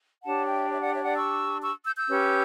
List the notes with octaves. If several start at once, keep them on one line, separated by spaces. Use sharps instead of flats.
D4 G4 C#5 F#5 A5
E5 G5
C#5 E5
D5 F#5
C#5 E5
D5 F#5
C#6 E6
C#6 E6
E6 G6
E6 G6
C#4 G4 B4